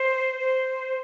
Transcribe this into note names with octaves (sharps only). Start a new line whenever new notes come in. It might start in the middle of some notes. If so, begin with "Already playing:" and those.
Already playing: C5
C5